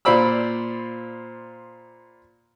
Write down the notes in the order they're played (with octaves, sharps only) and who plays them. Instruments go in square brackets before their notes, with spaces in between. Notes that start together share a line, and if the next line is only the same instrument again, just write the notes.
[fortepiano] A#2 F4 C5 D5 B5 E6